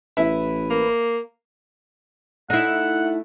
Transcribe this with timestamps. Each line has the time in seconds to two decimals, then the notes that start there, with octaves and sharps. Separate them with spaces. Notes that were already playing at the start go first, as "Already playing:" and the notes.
0.17 A1 E4 B4
0.70 A#3
2.50 A3 D#4 E4 F#5